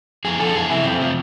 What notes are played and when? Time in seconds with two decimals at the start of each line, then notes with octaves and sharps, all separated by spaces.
0.25 F2 G#4
0.39 D3 F3 A4
0.55 F2 G#4
0.70 C3 E3 E4
0.85 F2 C4
1.00 C3 F3